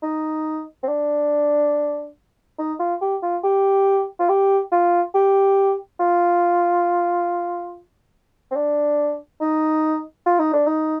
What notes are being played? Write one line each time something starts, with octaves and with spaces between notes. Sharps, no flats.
D#4
C4
D4
D#4
F4
G4
F4
G4
F4
G4
F4
G4
F4
C4
D4
D#4
F4
D#4
D4
D#4